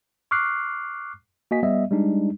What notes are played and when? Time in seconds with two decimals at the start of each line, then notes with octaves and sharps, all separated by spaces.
0.31 C#6 D6 F6 F#6 C7
1.51 A#3 F#4 D#5 G#5 B6
1.63 G3 B3 D#5 E5
1.91 G3 G#3 D4 D#4